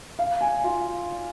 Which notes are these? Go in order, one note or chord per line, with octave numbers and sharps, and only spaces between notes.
F5
G#5
F4